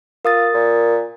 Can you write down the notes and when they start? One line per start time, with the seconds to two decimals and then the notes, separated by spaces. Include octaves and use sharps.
0.25 F4 A#4 D#6 A6
0.54 A#2